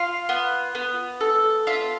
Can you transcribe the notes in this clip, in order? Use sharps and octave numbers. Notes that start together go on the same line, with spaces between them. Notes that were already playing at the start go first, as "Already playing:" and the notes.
Already playing: F4 F5
B3
B3
A4
F4 E5